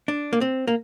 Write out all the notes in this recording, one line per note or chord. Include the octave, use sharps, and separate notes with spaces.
D4
A#3
C4
A#3